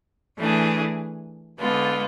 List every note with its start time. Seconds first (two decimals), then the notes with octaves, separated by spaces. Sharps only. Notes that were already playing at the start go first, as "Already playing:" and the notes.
0.37 E3 A3 D4 G#4
1.59 D3 G#3 B3 F4 A4